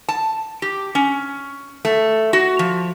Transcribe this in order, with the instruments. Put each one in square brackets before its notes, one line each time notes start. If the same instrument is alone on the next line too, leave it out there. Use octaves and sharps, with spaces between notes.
[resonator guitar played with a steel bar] A5
G4
C#4
A3
F#4
F3